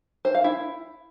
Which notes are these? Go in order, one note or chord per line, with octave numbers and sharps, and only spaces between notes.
C5
F5
E4